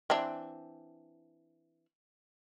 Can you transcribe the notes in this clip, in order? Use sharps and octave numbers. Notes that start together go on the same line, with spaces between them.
E3 C4 D4